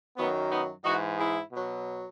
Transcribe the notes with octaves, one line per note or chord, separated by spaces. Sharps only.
F#2 D#3 F#3 B3
B3 D#4
G#2 E3 D#4 F#4
E4 G#4
B2 F#3